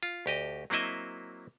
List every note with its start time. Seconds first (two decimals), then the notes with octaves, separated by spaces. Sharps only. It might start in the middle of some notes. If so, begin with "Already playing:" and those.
0.03 F4
0.26 D2 G4 D#5
0.70 F#3 A#3 C4 E4 D#5 E5